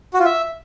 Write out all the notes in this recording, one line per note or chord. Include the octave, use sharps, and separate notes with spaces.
F#4
F4
E5